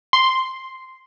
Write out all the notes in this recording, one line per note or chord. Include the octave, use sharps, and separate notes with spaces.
C6